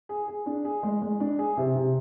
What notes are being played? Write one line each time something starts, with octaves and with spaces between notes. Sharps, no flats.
G#4
G#4
D4
G#4
G#3
G#3
D4
G#4
C3
C3